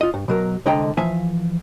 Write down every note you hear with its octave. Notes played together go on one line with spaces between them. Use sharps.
F4 D#5
G2
B2 F#3 A#4
C2 D3 G#3 D#5 G5 A#5
E3 F3 E5 F5 G#5